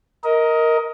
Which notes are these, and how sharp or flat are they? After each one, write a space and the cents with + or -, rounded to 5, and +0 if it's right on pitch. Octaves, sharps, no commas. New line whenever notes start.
A#4 +0 D#5 +20